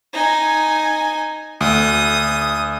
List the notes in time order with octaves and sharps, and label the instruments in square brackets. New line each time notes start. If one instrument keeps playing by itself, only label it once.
[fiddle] D#4 G#5
[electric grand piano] D2 [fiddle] D#6